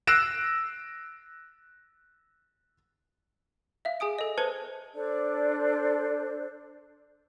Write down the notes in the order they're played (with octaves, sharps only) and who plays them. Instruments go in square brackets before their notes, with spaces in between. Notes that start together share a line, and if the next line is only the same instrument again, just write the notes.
[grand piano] E6 F#6 A#6 C7 D7 E7
[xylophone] E5 F5
G#4 G#5 D#6 D7
A4 D#5
B4 C5 A5 G#6 C#7 F#7
[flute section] D4 A4 C5 D5